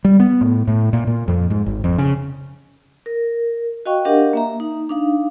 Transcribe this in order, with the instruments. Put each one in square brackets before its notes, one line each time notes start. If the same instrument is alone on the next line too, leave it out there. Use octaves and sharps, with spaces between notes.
[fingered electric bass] G3
B3
A2
A2
A#2
A#2
F2
G#2
G#1
F2
C#3
[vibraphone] A#4
F#4 D#5 F5 G5 C#6
D4 G4 A#4 D#5 F5 F#5
A#3 E5 A#5
D#4
D4 D#4 F5